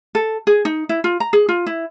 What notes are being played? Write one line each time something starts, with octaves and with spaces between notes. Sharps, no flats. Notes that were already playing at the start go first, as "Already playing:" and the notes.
A4
G#4
D#4
E4
F4
A#5
G#4
F4
E4